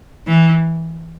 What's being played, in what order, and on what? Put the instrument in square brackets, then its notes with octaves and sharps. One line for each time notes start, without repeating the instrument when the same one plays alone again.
[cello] E3